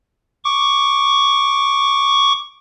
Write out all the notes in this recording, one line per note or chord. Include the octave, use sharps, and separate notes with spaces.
C#6 D6